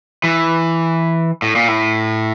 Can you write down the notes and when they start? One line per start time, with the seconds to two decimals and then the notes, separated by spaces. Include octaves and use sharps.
0.24 E3
1.42 A2
1.55 A#2
1.68 A2